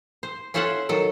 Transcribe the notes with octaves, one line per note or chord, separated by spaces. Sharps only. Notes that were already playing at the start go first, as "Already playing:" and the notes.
C5
C#4 F4 A4 C5 E5 F#5
D#3 F#3 A4